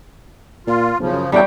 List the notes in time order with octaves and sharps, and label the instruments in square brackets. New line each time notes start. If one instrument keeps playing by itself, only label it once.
[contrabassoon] A#2 [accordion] F4
[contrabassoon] B1 [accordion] C#3 F3
[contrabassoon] F#2
[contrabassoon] E2 [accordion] F#3 A3 D4 [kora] G3 F#4 G5